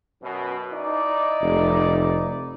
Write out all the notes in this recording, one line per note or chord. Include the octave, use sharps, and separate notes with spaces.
F#2 B2
D#4 E4 D5
F1